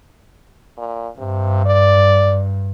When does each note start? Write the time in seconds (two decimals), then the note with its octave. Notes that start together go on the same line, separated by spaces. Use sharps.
0.78 A#2
1.18 G2 C3
1.66 D5